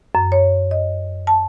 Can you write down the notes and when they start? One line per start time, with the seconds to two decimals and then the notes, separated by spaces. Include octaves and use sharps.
0.15 F#2
0.32 C#5
0.71 D#5
1.27 A5